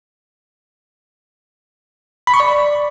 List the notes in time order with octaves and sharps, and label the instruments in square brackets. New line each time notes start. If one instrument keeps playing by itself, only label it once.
[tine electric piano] B5
C#6
D5